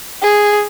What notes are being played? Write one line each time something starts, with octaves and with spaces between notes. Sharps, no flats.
G#4